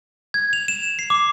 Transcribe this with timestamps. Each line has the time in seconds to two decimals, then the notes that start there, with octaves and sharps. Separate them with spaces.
0.34 G#6
0.53 F7
0.68 E7
0.99 C7
1.10 D6